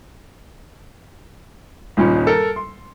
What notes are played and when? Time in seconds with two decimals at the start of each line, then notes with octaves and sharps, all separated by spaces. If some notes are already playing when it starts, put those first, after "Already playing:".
1.97 D#1 G2 A#2 C#4 D#4 B5
2.27 A4 A#4
2.56 C6